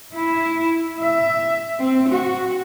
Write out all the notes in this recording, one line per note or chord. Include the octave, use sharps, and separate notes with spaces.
E4
E5
C4
F#4